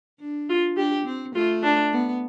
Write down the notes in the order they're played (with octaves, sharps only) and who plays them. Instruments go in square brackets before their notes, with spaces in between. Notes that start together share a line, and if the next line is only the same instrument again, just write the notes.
[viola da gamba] D4
[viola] F4
[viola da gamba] D4 [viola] G4
[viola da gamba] C4
[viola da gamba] A3 [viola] F4
[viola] D4
[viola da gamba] B3